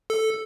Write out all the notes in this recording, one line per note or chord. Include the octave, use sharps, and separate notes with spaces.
A4